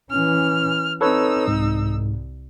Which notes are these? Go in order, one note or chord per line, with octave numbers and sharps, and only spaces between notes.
E3 C#4 F6
C4 D#4 A4 B4 C#5 E6
C2 G#2